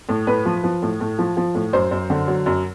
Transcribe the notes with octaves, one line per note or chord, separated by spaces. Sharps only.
A2
A2 B4
F3
F3
A2
A2
F3
F3
A2
F#2 C5
F#2
D3
F#3
F#2